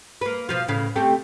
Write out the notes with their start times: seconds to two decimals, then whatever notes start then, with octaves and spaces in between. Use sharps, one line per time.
0.21 A#3 B4
0.49 B2 F3 F4
0.68 A2 C#3 F5
0.96 A3 C4 G4